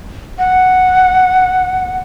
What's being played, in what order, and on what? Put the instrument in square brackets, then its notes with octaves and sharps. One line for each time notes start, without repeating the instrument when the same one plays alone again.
[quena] F#5